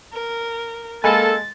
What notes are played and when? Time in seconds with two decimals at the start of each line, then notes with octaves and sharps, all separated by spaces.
0.13 A#4
1.04 G#3 A#3 A4 G#5 B5 A6